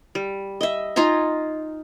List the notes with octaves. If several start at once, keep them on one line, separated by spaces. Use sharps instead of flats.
G3
D#5 E5
D#4 F4 G#5 A#5